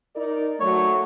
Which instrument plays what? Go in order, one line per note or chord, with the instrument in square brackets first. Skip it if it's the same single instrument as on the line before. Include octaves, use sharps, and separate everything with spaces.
[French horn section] D#4 A#4 D5
[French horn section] F#3 A3 [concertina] C#5